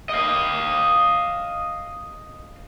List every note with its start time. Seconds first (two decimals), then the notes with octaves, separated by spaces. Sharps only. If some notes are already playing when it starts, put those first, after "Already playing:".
0.09 D#5 F5